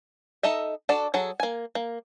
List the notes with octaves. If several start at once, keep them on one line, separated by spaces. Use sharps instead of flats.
D#4 A4 D#5 E5
D4 F#4 A4 D5
F#3 G#4 A4
A#3 G#5
A#3